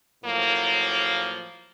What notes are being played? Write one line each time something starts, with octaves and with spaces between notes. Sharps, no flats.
A2 F3 F#3 A#3